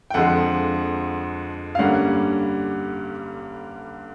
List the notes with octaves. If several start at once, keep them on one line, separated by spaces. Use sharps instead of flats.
G5
F2 D3 F3 G#3 F#5
F5
G2 D3 G3 A#3 C#4 F#5